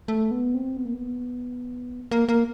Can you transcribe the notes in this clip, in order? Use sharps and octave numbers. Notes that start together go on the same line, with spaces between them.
A3
B3
C4
B3
A#3
B3
A#3
A#3